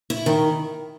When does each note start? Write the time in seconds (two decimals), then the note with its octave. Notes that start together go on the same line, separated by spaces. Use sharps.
0.10 E4
0.26 D#3